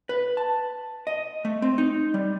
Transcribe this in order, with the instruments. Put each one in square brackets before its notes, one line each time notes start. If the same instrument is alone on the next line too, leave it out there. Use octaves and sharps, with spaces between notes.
[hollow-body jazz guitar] B4
A5
D#5
A3
C4
D#4
G3